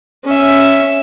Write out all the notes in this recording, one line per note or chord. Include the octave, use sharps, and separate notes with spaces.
C#4 E5